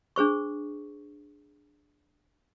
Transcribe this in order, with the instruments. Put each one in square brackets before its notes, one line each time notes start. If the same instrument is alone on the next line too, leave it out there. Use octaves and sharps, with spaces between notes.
[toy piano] D4 G#4 C5 C#6